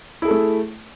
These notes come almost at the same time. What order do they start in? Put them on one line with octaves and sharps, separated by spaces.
E4 G#4 A4 A3